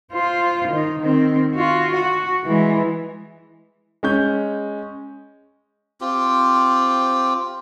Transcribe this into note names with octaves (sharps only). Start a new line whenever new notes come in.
F4 C5
D#3 D#4
D#3 C4
F4 F#4
F#4 F#5
E3 G#3
G#3 C#4 G6
C4 F4 G4